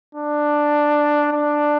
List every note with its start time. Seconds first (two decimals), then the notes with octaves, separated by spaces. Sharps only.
0.15 D4
1.32 D4